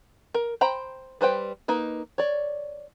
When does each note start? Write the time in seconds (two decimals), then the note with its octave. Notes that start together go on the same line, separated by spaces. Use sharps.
0.34 A#4
0.61 C5 G5 A#5 B5
1.21 G3 B4 C5 G5
1.68 A#3 D#4 B4
2.18 C#5 D5